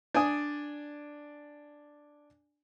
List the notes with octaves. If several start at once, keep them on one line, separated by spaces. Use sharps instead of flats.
D4 D5 G#5 D#6